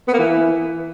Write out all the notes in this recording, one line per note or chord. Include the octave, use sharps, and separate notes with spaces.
B3
A#3
E3